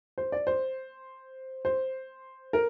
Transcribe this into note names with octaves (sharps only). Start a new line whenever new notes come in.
C5
D5
C5
C5
A#4